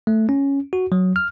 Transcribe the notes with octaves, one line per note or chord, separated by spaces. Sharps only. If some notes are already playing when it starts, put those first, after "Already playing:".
A3
C#4
F#4
F#3
F6